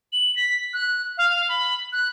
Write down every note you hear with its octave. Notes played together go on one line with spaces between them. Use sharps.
F#7
B6
F#6
F5
B5
F#6